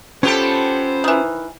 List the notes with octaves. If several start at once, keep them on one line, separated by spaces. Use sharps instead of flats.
B3 C#4 F4 G4 A4 C5 G5
D#3 E3